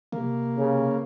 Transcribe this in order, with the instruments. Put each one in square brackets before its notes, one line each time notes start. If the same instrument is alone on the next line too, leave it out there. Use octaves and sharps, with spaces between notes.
[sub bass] C3 [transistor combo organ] A#3
[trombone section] C#3